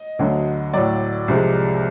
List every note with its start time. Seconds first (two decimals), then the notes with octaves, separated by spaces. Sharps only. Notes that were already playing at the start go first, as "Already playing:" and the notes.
Already playing: D#5
0.19 D2 D3 F#3
0.74 A2 F#3 D5
1.28 C2 C3 F3 G#3